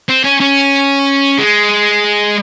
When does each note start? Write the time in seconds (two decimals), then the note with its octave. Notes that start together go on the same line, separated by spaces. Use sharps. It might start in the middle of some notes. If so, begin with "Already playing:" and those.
0.09 C4
0.24 C#4
0.40 C#4
1.38 G#3